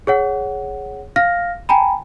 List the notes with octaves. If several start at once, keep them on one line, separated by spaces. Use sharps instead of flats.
G#4 C#5 F#5
F5 F6 A#6
G5 G#5 A#5 B5